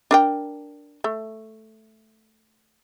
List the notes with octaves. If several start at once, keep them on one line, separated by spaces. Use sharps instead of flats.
D4 A#4 G5
A3